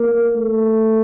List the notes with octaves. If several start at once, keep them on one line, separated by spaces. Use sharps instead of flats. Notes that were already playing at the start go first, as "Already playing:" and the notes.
Already playing: A#3
A3